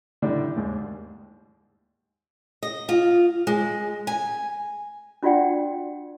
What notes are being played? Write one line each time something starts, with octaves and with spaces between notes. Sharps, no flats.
A2 D3 G3 D4 D#4
D#2 G#2
D#5
F4
G#3
G#5
D4 F4 F#4 D5 F#5 G5